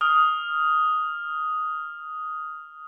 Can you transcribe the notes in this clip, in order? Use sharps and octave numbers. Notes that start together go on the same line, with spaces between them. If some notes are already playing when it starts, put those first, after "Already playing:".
D#6 F6